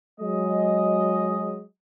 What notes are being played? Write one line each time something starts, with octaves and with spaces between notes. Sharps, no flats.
F#3 G#3 D#5